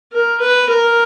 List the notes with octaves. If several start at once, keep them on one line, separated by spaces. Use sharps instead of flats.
A#4
B4
A#4